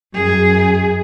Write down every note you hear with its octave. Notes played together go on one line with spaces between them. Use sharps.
F#2 G#4